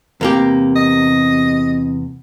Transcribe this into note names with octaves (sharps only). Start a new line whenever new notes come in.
E2 C3 A#3 G4
D#5